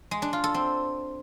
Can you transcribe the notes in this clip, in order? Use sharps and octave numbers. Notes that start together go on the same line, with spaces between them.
G#3
D4
F4
A4
C4